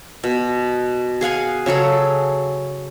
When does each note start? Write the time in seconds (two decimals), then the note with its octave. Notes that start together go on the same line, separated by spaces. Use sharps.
0.24 B2
1.21 G#4 F5 F#5 G#5
1.66 C#3 F#3 G#4 A4